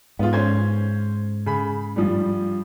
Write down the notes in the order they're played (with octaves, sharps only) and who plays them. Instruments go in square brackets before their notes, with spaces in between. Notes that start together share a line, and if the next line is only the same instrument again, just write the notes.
[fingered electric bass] G#2 [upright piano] B3 F4
[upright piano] C#4 C5 G#6
C#3 B5
G2 F3 G3